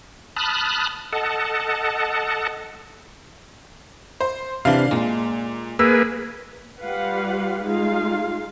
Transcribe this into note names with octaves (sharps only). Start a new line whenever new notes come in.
A5 B5 D#6 F6 F#6
A4 D#5 F#5 A5
C5
C3 E3 D4 F5
A#2 G#3
A#3 G#4 B4 E6
G3 F4 G4 B4 F5 F#5
G#3 D#4 F4 F5